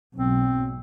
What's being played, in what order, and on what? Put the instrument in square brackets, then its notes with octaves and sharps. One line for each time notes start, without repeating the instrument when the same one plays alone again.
[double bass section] B1 G#2 F#3 [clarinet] C4